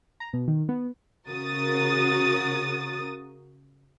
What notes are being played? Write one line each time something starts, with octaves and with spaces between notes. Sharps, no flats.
A#5
B2
D#3
B3
C#3 F#4 A#4 D#6 A6